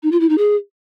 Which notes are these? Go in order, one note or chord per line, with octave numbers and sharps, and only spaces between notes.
D#4
F4
E4
D#4
G#4